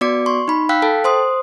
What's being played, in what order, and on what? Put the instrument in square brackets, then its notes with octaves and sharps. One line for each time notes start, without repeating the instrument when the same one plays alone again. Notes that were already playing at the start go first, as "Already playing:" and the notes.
[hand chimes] B3 F#4 D5 D6 C#7
C6 C#6
D#4 B5
F5 G5 E6 F#6 B6
A4 G5 A5
C5 C6 D#6